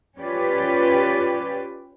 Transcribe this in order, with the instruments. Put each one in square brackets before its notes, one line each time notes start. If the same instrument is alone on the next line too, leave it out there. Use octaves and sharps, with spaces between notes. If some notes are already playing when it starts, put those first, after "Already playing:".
[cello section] C#4 F4 G4 B4 D5